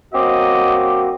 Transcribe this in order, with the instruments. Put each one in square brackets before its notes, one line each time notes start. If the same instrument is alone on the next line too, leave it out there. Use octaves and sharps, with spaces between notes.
[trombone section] F#3 A#3 F#4 [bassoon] C4 [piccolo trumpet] D#5 [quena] D6